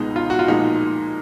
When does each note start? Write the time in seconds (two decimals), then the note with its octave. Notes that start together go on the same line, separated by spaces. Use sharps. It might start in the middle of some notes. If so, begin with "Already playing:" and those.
Already playing: C#2 B2 G#3 D#4
0.16 F4
0.30 F#4
0.39 F4
0.48 A#2 F3 G#3 D#4